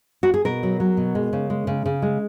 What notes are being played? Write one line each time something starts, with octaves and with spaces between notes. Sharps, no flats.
F#4
G#4
B2 A#4
F#3
F#3
B2
G#3
C#3
G#3
C#3
C#3
G#3